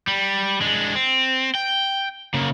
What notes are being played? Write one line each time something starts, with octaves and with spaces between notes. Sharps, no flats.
G3
G#3 D4
C4
G5
C#3 A#3